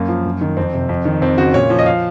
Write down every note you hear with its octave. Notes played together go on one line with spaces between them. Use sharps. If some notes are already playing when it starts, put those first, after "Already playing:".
Already playing: F#2 A#3
F3
F#2
D#3
F2 C4
C3
F2
D#3
F2 C4
C#3 F#4
A#2 C#5
F3
D#5
F5